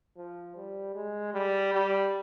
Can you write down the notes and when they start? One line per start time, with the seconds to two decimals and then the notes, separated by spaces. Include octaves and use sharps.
0.16 F3
0.56 G3
0.95 G#3
1.34 G3
1.73 G3